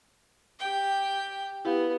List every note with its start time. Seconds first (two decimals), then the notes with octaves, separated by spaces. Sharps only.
0.60 G4 G5
1.65 B3 E4 G4 F5